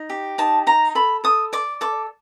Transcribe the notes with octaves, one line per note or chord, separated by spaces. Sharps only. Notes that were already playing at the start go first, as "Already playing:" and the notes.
Already playing: D#4
G4
D#4 A5
D#4 A#5
A4 B5
A4 D#6
D5 D6
A4 D6